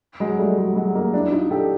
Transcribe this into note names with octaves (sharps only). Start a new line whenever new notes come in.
F#3 G#3
G3 A3
F#3 G#3
F#3 G#3
G#3 A#3
D4 E4
D#4 F4
G4 A4